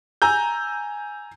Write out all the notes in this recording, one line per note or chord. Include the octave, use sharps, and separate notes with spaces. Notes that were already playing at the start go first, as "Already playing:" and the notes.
G#5 A#5 E6 G6